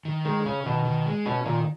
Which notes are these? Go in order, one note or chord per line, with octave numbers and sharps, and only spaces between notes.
D#3
D#3 G#3
C#3 C#4
B2 D#3
D#3
G#3
B2 C#4
A#2 D#3